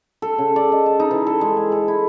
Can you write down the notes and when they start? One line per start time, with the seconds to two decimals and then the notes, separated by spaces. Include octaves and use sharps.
0.22 A4
0.38 C#3
0.56 D5
0.72 D#5
0.86 A5
1.00 D#4
1.11 E3
1.27 A4
1.41 G#3
1.57 G#5
1.72 A4
1.88 E4